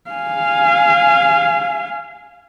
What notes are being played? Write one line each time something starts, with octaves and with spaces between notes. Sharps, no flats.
F5 G#5